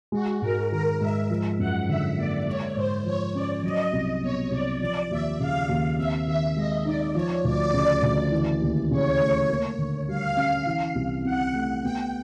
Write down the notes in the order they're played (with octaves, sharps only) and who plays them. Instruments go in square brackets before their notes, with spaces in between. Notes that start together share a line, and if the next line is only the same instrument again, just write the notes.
[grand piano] G#3 [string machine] F#4
[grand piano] G#2 [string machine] A#4
[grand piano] D#3 [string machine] A#4
[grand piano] G#2 [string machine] E5
[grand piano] F3
[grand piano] F#2 [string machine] F#5
[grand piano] D3 [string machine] E5
[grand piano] A#3 [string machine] D5
[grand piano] G#3 [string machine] C#5
[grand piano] G#2 [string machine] C5
[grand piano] F3 [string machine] C#5
[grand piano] C#4 [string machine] D5
[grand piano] F#3 [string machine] D#5
[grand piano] C2
[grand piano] B2 [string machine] C#5
[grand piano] C2 [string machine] D5
[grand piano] F3 [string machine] D5
[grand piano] D#2 [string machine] E5
[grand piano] C#3 [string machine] F5
[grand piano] D#2
[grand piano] C4 [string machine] E5
[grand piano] D#3 [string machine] E5
[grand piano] G#3 [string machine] D#5
[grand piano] D#4 [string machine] D5
[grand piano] F3 [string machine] C#5
[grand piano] D2 [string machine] D5
[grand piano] C#3
D2
E3
D#2
[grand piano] C#3 [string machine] C#5
[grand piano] A3
A#3
D3
[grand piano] G3 [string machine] F5
[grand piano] C#4
E3
C2
[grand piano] C3 [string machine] F#5
[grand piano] A3
[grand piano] B3 [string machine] G5